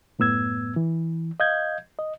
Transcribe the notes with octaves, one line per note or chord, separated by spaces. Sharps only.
F#2 A2 B3 E6 G#6
E3
D#5 F5 G6 G#6
D#5